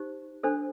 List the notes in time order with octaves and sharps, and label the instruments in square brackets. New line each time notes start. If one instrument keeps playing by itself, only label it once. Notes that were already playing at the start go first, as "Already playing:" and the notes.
Already playing: [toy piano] D#4 G4 C5
D4 A4 C5